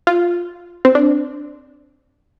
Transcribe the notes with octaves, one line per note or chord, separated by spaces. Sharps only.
F4
C4
D4